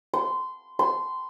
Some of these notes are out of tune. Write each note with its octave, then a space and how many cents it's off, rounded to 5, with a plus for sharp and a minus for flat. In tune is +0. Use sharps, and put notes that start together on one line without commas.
C6 -20
C6 -15